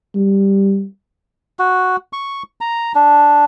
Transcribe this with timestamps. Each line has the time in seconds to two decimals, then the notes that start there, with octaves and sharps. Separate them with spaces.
0.15 G3
1.59 F#4
2.13 C#6
2.61 A#5
2.95 D4